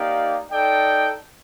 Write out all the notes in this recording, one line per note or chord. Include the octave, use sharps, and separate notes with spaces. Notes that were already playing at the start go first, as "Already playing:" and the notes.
Already playing: A#3 D#4 G4 D5 F5
D#4 A4 D5 G5